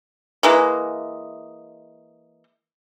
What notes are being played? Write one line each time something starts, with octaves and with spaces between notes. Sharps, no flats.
E3 G#3 A#3